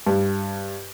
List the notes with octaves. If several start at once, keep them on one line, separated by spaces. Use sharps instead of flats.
G2